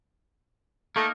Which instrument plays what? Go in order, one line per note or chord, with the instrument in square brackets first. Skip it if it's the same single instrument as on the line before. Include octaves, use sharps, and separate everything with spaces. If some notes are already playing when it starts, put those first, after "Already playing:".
[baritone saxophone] A3 [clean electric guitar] A#3 D#4 A#4